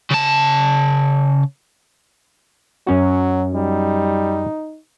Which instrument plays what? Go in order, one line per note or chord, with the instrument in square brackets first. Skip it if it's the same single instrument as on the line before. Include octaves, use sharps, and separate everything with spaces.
[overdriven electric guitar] C#3 A5
[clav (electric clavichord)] F#2 C#4 F#4 [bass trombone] F#3
[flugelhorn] G3 [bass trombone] D#4